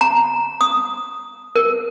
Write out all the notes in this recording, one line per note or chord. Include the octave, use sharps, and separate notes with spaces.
A#5
D#6
A#4